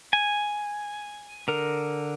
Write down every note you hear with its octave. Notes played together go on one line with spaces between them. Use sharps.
G#5
D3 A#4